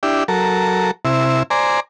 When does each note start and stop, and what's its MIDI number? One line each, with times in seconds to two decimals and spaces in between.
0.03 0.24 62
0.03 0.24 64
0.03 0.24 67
0.28 0.91 54
0.28 0.91 69
0.28 0.91 70
1.05 1.43 48
1.05 1.43 64
1.50 1.80 72
1.50 1.80 74
1.50 1.80 80
1.50 1.80 82